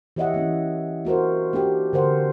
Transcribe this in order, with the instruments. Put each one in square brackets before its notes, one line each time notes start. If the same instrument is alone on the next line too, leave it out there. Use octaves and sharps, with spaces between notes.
[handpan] E3 G4 C#5 D#5 E5 F#5
E3 A#3 C#4
A#3 F#4 A#4 C5
A#3 D4 F#4 G4
D3 A#4 C5 F#5